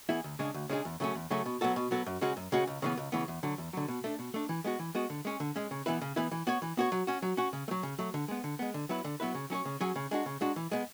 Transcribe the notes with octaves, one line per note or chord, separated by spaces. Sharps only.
E3 B3 E4 G#4
D2
C#3 G#3 D4 G#4
D2
C#3 G#3 D4 G#4
E2
C#3 F#3 A3 C#4
E2
C#3 F#3 A3 C#4
B2
F#3 B3 F#4 A4
B2
F#3 B3 F#4 A4
F#2
C#3 G#3 C#4 F#4
F#2
C#3 G#3 C#4 F#4
C#2
C#3 E3 B3
C#2
C#3 E3 B3
E2
D3 F#3
E2
D3 F#3
B2
A3 D4
B2
A3 D4
E3
G#3 B3 F#4
E3
G#3 B3 F#4
D3
G#3 C#4
D3
G#3 C#4
C#3
E3 B3 E4 B4
C#3
E3 B3 E4 B4
E3
B3 F#4 C#5
E3
B3 F#4 C#5
F#3
C#4 F#4
F#3
C#4 F#4
C#3
A3
F#3
C#3
F#3 A3
D3
G#3 B3
D3
G#3 B3
D3
F#3 B3 E4 B4
D3
F#3 B3 E4 B4
C#3
F#3 C#4 G#4 C#5
C#3
F#3 C#4 G#4 C#5
C#3
G#3 D4 F#4
C#3
G#3 D4 F#4
E3
G#3 B3